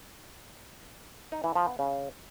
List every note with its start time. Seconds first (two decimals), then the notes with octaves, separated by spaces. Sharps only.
1.32 D#4
1.44 E3
1.55 F3
1.67 B3
1.79 C#3